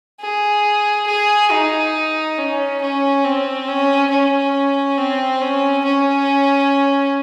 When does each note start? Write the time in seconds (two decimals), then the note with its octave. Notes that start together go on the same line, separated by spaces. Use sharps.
0.21 G#4
1.07 G#4
1.52 D#4
2.38 C#4
2.82 C#4
3.24 C4
3.68 C#4
4.11 C#4
4.98 C4
5.41 C#4
5.85 C#4